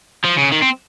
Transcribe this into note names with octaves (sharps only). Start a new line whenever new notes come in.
F3
C#3
D#3
C4